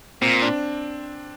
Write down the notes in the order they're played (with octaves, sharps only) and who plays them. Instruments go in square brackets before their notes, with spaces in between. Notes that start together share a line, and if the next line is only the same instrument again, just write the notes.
[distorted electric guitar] A#2 [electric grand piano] C4
[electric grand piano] D4